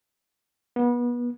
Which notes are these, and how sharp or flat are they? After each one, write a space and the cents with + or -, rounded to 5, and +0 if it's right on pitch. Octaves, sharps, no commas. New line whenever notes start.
B3 -30